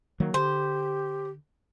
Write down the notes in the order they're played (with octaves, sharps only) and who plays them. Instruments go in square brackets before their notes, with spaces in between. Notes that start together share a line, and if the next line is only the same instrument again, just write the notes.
[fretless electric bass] D#3 F#3 A#3
[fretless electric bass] D3 [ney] G4 [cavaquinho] C5